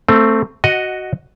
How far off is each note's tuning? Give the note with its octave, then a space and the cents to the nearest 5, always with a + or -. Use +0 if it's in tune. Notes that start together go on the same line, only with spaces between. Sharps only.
A3 +15 C4 +0
F#4 +5 D#5 +0 F#5 -10